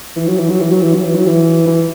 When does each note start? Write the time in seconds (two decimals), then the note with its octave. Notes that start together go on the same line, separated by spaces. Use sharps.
0.16 E3
0.27 F#3
0.38 E3
0.49 F#3
0.60 E3
0.71 F#3
0.82 E3
0.94 F#3
1.04 E3
1.15 F#3
1.27 E3
1.67 E3